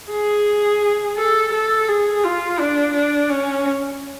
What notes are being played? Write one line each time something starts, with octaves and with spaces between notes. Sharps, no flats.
G#4
A4
A4
G#4
F4
D4
D4
C#4